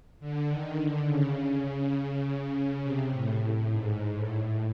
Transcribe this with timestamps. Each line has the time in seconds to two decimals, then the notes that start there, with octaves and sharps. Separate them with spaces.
0.20 D3
0.49 D#3
0.78 D3
1.07 C#3
2.83 C3
3.12 A2
3.41 A2
3.71 G#2
4.14 A2